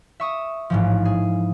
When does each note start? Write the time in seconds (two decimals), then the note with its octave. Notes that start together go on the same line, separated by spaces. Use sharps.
0.20 E5 C#6 D#6
0.70 A1 G#2 F3
1.05 G#4